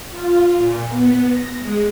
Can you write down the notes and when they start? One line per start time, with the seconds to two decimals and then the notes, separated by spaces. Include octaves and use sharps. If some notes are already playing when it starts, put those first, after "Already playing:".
0.10 F4
0.57 A#2
0.89 B3
1.28 A#6
1.59 G#3